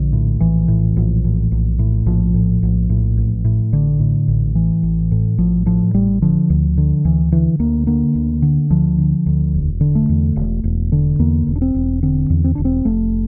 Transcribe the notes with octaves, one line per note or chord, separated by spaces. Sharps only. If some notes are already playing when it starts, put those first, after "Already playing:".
Already playing: A#1 D3
A2
A#1 E3
A2
A#1
A2
A#1
A2
A#1 F3
A2
A#1
A2
A1
A2
A1 D3
A2
A1
A2 E3
A1
A2
A1 F3
A2 F3
A1 G3
D3 F3
D2
D3
D2 E3
D3 E3
D2 A#3
D3 A#3
D2
D3
D2 F3
D3
D2
E1
D3
A3
E2
E1
E1
D3
E2 A#3
E1
D4
C4
E1
D3 C4
E2
C4
E1 D4
C4
F1 A3